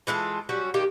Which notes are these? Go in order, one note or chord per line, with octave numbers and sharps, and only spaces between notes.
E3 G#3 F4 A4
F#3 G3 C#4 F#4
D#3 A#3 G4